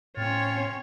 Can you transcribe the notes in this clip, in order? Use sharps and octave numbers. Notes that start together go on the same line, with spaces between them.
A2 C4 C#4 F4 C#5